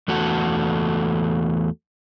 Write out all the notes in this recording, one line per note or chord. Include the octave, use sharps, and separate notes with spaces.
E2 A3 F#4 A4